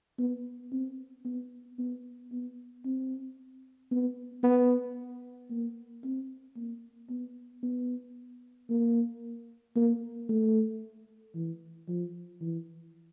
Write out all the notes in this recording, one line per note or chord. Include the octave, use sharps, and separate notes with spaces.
B3
C4
B3
B3
B3
C4
B3
B3
A#3
C4
A#3
B3
B3
A#3
A#3
A3
E3
F3
E3